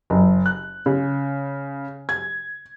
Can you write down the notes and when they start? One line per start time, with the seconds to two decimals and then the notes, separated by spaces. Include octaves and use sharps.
0.10 F#1
0.46 F#6
0.86 C#3
2.09 G#6